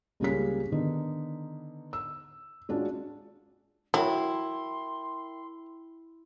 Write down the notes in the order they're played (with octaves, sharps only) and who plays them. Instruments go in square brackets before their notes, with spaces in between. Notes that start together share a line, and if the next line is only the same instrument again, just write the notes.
[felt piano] C#2 G3 A#3 C#4 G#4 B6
D3 D#3 B3 D#4
E6
G#3 C#4 D4 F4 F#4
[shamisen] F#3 [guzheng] E4 [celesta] A#4 E5 G5 [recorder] C6